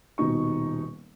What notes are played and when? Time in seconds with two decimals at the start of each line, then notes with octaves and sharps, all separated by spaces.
0.18 D#1 B2 D#4 C#6